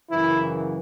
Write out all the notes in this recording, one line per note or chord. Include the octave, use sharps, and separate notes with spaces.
F#2 C#3 E3 E4